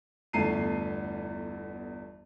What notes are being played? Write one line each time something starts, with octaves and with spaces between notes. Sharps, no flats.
G1 E2 A3 A5 C7 D#7